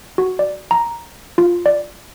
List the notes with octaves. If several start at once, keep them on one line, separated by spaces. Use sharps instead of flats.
F#4
D5
A#5
F4
D5